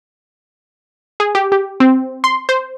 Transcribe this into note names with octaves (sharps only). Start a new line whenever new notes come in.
G#4
G4
G4
C4
C6
C5